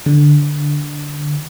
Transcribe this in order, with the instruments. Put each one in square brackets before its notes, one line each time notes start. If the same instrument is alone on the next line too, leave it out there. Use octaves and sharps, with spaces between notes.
[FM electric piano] D3